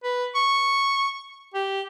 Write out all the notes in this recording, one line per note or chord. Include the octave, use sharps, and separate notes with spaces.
B4
C#6
G4